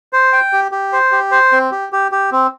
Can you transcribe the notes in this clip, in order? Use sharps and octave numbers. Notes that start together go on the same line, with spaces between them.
C5
G5
G4
G4
C5
G4
C5
C4
G4
G4
G4
C4